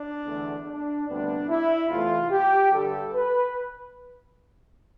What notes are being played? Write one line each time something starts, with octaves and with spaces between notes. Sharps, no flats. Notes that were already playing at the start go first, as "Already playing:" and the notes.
Already playing: D4
E2 D3 A3
D4
D2 C3 G3 B3 D4
E4
E2 C3 E3 A3 F4
G4
G2 D3 G3 A4
B4